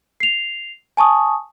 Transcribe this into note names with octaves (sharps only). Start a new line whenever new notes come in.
C7 F7
G#5 A5 C#6 D#6